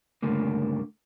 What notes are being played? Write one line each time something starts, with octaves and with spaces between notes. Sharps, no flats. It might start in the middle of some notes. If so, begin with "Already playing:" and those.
C#2 G2 D3 A3 A#3